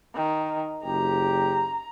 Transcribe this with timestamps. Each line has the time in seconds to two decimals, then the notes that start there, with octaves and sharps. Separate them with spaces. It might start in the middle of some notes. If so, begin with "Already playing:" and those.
0.15 D#3
0.84 F#1 G4 A#5